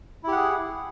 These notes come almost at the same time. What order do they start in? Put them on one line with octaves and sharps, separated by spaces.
E4 G4 F#5 G#4